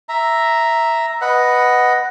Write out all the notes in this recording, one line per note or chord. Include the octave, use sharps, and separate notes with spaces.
E5 A#5
B4 D#5 F#5